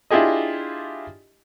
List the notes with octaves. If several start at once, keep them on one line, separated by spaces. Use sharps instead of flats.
D4 E4 F4 G4 G#4 D#5